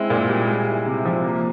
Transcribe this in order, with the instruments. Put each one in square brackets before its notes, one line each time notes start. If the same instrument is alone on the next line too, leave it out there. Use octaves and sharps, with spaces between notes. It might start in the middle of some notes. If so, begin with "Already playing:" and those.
Already playing: [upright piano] G#3 C4 E4
A#2
G3
G#3
E4
C3
F3
A#3